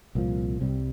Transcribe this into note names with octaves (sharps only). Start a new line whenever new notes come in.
C2 A#2 F3
C2 C3 G3